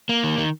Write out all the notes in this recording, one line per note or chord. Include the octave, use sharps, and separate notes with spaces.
A#3
D#3
D#3